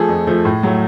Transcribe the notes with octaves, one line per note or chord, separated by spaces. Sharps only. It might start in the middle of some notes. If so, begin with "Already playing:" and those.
Already playing: F3 A3 G#4 A4
F2
F3 A3
A2
F#3 A3